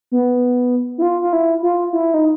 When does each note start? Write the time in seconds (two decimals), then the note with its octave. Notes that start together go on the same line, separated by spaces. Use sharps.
0.12 B3
0.98 E4
1.02 F4
1.22 F4
1.33 E4
1.63 F4
1.93 E4
2.14 D#4